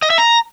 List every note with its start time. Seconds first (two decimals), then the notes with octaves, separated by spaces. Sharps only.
0.02 D#5
0.10 E5
0.18 A#5